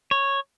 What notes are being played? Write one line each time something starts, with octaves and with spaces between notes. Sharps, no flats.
C#5